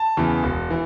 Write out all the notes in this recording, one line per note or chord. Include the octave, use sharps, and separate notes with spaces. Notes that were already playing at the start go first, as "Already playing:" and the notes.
Already playing: A5
E2 C#3 E3
E1
E3